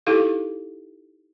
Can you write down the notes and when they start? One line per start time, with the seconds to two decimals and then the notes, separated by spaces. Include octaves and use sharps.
0.07 D#4 E4 G4 A4 F5